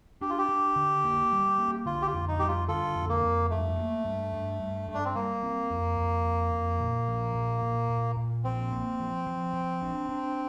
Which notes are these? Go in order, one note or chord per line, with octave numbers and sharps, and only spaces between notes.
D4 G4
F4
G4
D4
D3
A#3
G3
A#3
D3 F4
G4
F4
F2
D#4
G3 G4
F4
D3 F4 A4
F2
A#3
F2
G2 A3
A#3
G2
G2
G2
G2
D4
C4
G3 A#3
C4
F2
F2
F2
F2
A#2
F3
A#2
A#2
A#2
A#2
F3 C4
A#3
F3
F3
F3
D4
D4